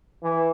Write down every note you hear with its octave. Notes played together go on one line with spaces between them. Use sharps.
E3